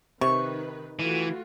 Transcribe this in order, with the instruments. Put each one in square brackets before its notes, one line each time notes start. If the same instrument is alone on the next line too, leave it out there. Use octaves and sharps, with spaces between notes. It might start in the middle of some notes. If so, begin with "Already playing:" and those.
[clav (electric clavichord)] C3 [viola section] D#3 B4 [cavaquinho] C#6
[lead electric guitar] E3 [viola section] A3 F4 F#4